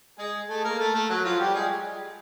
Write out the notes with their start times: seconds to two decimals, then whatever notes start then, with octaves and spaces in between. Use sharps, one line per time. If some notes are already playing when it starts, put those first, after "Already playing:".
0.19 G#3 G#4
0.49 A3 A4
0.64 A#3 A#4
0.79 A3 A4
0.94 A3 A4
1.09 F#3 F#4
1.25 F3 F4
1.39 G3 G4
1.54 G#3 G#4